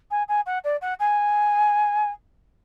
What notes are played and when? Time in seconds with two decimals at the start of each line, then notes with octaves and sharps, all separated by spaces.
0.11 G#5
0.29 G#5
0.46 F#5
0.64 D5
0.82 F#5
1.00 G#5